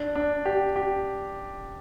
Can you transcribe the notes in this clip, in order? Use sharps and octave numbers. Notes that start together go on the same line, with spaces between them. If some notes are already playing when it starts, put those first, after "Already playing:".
Already playing: D4
D4
G4
G4